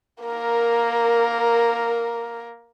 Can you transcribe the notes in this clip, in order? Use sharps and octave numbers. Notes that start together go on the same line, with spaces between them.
A#3 A#4